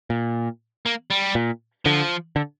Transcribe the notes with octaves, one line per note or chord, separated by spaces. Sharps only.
A#2
A#3
G3
A#2
D3 F3
D3